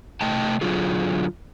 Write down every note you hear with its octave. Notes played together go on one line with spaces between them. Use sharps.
C3 A3 D#5 G5 A5
D3 F#3 F4 G#4